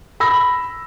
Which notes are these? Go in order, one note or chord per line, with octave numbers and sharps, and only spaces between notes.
B5 E6 A#6